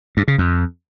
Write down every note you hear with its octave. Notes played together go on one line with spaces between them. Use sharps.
G2
C#3
F2